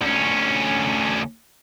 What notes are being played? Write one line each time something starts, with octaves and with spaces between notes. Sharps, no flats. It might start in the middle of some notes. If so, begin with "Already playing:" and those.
D2 C#4